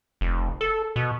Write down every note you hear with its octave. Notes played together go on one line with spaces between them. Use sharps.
F1
A4
B2